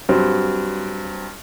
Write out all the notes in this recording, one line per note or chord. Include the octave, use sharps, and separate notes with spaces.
G2 F#3 C4